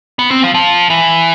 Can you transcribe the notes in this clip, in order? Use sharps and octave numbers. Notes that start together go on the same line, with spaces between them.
B3
C4
F3
F3
E3